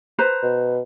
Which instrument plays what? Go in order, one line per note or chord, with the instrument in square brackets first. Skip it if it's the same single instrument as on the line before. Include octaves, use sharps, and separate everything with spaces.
[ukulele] B4 C5 A#5
[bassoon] B2